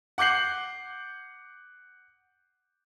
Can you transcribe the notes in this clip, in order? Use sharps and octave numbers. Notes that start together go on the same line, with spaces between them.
F#5 D6 G6 C7 F#7